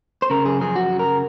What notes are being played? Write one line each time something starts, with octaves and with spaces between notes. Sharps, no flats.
C5
C#3 A#4
F#2 G#4
F3 G#4
F#2 F#4
C#3
A#4